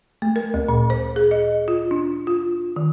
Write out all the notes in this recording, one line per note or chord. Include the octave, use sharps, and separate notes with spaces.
A3
A#4
D2
A#2
C5
G#4
D#5
F4
D4
F4
D#3